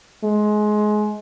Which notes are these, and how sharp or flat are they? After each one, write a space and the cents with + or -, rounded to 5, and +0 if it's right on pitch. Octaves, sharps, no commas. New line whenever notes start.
G#3 +25